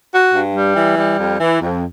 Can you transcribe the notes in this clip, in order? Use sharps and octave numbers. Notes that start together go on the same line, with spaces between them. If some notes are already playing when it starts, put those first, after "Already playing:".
F#4
G2
G3
E3
G3
F2
E3
F2